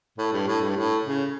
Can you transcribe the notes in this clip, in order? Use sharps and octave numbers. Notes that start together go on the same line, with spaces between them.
A2
G2
A2
G2
A2
C#3